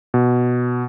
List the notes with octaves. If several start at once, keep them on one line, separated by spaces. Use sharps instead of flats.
B2